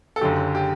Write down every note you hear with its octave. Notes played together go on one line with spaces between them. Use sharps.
A4
F#1 F#2 D3 G4
G4